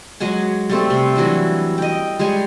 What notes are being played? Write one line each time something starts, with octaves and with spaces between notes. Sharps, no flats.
F#3 G#3 F#5 G#5
G3 A3 C4
C3
E3 F#3 G3 D4
D#5 G5
G3 G#3 C#5 G#5